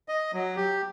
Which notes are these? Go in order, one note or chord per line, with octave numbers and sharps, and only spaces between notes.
D#5
F#3
G4